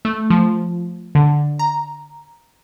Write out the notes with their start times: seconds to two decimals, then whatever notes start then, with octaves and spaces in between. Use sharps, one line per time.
0.05 A3
0.30 F3
1.15 D3
1.59 A#5